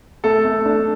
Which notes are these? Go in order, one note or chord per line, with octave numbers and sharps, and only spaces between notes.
A3 A4
A3
D4